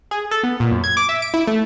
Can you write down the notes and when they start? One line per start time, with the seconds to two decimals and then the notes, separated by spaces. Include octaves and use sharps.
0.11 G#4
0.31 A4
0.43 B3
0.60 A#2
0.71 F#2
0.84 G#6
0.97 D6
1.09 E5
1.22 D7
1.34 E4
1.47 A3